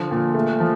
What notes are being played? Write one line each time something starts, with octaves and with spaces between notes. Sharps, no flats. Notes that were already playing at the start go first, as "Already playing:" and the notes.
Already playing: D3 F3
A#2
A3
F3